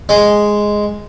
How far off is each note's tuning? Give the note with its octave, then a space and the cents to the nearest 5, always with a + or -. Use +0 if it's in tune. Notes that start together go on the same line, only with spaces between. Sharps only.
G#3 +0 D#5 +0